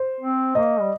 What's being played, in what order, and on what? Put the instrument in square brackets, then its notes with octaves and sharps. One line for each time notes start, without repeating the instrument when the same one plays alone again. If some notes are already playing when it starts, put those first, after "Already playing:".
Already playing: [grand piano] C5
[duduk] C4
[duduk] A#3 [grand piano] D#5
[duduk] G3